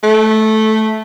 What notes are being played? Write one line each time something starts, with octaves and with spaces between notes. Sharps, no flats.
A3